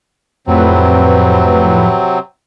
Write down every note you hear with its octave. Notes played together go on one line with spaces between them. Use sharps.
F2 A2 C3 F#3 C4 B4